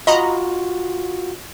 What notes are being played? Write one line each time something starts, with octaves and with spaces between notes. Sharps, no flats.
F4 F#4 D#5 A#5 B5